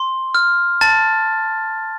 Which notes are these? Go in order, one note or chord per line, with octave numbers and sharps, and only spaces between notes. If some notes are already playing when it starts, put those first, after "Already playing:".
Already playing: C6
F6
A5 A6